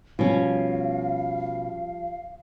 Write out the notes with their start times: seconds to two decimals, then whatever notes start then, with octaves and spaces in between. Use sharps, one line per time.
0.19 B2 F3 G3 C#4 F5